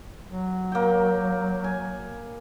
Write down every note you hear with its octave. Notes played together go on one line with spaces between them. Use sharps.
F#3
A#3 G5
G#5